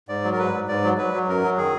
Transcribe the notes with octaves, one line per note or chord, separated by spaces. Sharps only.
G#2 D5
F#3
A#4
G#2 B4
G#2
G#2 D5
F#3
F#3 B4
F#3
F#2 A#4
F#3
D#3 G#4